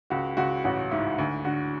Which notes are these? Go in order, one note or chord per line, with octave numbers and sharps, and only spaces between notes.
C#2 F#4
C#2 F#4
A1 F#4
G#2 E4
D2
D3 F#4